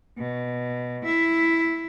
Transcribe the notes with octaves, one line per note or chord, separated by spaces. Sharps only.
B2
E4 E5